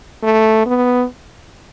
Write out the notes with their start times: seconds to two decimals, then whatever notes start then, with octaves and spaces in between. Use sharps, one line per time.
0.23 A3
0.66 B3